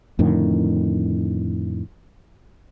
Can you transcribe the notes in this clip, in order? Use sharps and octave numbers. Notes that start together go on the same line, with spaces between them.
F2 A2 D3 D#3